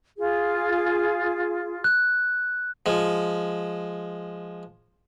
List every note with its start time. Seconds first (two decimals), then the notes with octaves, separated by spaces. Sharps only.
0.18 F4 G#4
1.84 F#6
2.86 F3 G#3